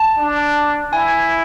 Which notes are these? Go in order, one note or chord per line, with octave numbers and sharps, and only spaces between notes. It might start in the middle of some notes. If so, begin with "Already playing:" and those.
Already playing: A5
D4
E4 G#5